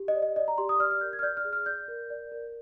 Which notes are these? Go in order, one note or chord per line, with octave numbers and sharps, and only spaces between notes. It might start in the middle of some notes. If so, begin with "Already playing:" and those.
Already playing: G4
D#5
D5
D#5
D5 D#5
A#5
G4 C6
D#6
D5 F6
F6
A#4 G6
G#6
F6
D5 G6
F6
G#4
F6
D5 G6
A#4
D5
A#4